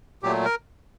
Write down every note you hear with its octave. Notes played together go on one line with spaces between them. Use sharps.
A#2 F#3 A3 G4
A#4